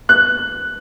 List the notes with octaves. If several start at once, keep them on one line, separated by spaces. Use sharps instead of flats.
F#6